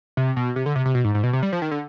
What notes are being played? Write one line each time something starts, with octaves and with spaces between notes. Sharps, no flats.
C3
B2
C3
D3
C3
C3
B2
G#2
G#2
B2
C3
G3
F3
D#3
D3